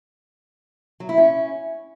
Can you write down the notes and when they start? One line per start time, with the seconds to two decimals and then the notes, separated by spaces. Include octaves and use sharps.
1.00 F#3
1.09 E4
1.18 C#4